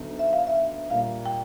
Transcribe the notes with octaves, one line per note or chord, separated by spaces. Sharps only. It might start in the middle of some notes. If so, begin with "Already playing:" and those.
Already playing: D2 D3 F#3 B3 D#4
E5
F5
E5
A#2 G3 A#3 D4 F5
G5